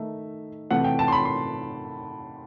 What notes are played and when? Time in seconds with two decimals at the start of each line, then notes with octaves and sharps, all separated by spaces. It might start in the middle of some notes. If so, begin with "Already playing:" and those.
Already playing: D#3 A3 D#4 E5
0.71 C3 E3 A3 F#5
0.84 G5
0.99 A5
1.08 C6
1.12 B5
1.25 C6